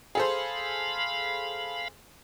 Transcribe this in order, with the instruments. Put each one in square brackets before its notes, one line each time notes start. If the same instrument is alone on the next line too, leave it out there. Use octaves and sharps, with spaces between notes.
[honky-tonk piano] G#4 A4 C5 [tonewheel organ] F5 B5